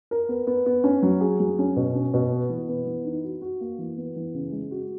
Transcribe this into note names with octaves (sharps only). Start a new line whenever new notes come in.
A#4
B3
B3
B3
C#4
F#3
G#4
F#3
C#4
B2
C#4
B2
B3
E3
B3
E3
D#4
F#4
F#4
A#3
E3
B3
E3
C#3
G#3
F#4